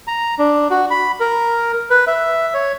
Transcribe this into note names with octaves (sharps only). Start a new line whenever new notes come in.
A#5
D4
F#4
B5
A#4
B4
E5
C#5